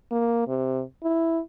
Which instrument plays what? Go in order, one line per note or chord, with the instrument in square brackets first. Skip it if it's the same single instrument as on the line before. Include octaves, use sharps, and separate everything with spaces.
[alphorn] A#3
C3
E4